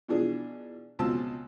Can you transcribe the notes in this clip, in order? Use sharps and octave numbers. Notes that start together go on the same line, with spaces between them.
B2 E3 F3 D4 G#4
C#2 B2 C4 F4 A5 E6